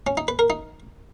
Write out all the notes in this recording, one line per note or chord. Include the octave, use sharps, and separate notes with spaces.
C#4
D#4
B4
A#4
D#4